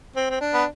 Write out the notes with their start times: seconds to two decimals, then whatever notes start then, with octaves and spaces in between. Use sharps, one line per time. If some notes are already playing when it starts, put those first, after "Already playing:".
0.16 C4
0.30 C4
0.41 D4
0.54 B3